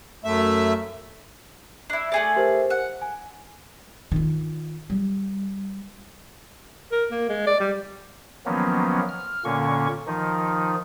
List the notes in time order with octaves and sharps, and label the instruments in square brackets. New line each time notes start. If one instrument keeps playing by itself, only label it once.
[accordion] F#2 A3 E5
[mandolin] D4 E4
A3 G#4 D5
[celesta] G4 A#4 C5
[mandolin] F#5
[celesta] G#5
[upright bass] D#3 F4
G3
[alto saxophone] A#4
A#3
G#3
D5
G3
[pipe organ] D#3 F3 F#3 A#3 B3 C#4
F6
A#2 D3 A#3 C#4 C#6
D#3 F3 D#4